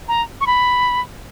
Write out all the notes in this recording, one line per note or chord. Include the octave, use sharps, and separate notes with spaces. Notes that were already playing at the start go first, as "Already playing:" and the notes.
A#5
C#6
B5